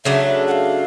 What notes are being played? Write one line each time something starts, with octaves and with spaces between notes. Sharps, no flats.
C#3 F#3 A3 D4 E5
F#5
F5